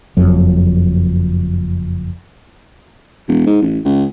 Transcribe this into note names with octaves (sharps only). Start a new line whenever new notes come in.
F#1 F2 F#3
E1
G#2
A1
C#2